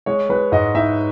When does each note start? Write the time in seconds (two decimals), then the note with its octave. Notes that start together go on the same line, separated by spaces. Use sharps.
0.06 G#3 C#5
0.29 G#3 B4
0.52 G#2 D#5
0.75 D#4 E5